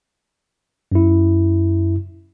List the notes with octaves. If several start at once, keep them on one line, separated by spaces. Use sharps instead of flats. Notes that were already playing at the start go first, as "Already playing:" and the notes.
F#2 E4